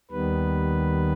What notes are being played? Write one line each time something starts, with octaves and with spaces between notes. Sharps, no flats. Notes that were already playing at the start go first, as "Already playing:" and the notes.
D#2 D#3 G3 B3 B4